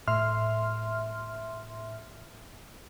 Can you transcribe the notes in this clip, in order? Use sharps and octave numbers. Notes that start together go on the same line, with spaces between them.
A2 E5 C6 F6